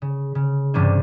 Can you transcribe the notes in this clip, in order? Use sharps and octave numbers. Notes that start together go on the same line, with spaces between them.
C#3
C#3
G2 C3 E3 G3 C#4 D4